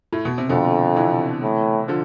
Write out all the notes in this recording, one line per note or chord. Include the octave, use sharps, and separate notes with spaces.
A2
B2
C3
F2 B2 D3
C3 E3
A2
D3 F3